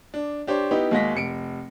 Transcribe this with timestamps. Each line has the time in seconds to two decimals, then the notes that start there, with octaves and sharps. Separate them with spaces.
0.14 D4
0.47 D4 G4 C5 C#5
0.71 B3 D#4 E4 G4
0.91 D#2 G#3 F#4 A#6 B6
1.15 F1 C#7 D7